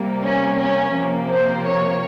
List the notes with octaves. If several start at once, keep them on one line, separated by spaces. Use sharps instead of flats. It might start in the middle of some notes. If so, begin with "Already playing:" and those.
Already playing: C3 G3 A#3
C#4
C#4
C3 F3 A#3
C5
C#5